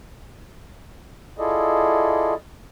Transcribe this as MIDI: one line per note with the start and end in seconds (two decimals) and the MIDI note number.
1.38 2.34 64
1.38 2.34 65
1.38 2.34 68
1.38 2.34 69
1.38 2.34 74
1.38 2.34 75